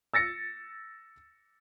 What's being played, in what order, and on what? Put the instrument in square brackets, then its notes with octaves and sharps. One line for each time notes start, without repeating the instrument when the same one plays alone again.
[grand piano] E6 A6 A#6 C#7